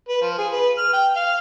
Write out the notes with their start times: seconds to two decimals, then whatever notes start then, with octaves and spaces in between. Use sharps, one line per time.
0.09 B4
0.21 F3
0.38 G#4
0.52 B4
0.78 F6
0.93 G5
1.16 F5